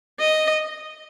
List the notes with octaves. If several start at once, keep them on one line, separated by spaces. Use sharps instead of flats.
D#5